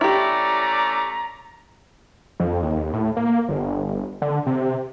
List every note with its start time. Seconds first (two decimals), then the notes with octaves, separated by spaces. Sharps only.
0.01 A3 C#4 E4 G4 D5 A#5
2.40 F2
2.62 D#2
2.93 A2
3.17 A#3
3.48 G1
4.22 D3
4.46 C3